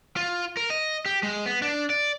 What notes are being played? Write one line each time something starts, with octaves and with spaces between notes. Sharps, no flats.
F4
A#4
D#5
G4
G#3
B3
D4
D5